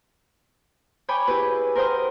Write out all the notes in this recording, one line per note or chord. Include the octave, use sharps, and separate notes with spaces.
C#5 G5 G#5 B5 C#6 D6
E4 G4 G#4 B4
A#4 C5 F#5 G5 D#6 F6